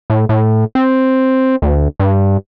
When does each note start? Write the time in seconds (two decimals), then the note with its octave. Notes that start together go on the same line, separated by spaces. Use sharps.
0.10 A2
0.29 A2
0.75 C4
1.62 D2
2.00 G2